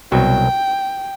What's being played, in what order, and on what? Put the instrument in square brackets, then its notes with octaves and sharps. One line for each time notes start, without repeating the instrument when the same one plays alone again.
[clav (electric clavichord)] C2 B2 F#3 [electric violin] G5